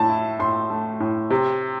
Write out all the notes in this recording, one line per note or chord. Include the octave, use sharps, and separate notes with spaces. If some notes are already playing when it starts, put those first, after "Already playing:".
Already playing: A2 A3 A5
E4
A2 C6
A3
A2
C3